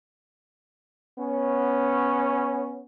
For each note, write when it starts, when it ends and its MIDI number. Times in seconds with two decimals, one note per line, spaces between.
1.19 2.84 59
1.19 2.84 61